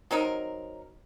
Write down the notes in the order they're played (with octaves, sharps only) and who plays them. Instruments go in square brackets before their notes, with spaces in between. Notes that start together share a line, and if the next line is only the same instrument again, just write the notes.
[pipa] F#3 C4 D#4 A#4